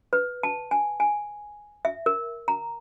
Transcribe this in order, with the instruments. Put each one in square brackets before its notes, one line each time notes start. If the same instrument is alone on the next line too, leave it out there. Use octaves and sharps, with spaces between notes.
[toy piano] B4
A5
G#5
G#5
E5
A#4
A#5